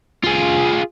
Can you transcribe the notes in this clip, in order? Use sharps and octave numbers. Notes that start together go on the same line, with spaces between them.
F4 G#4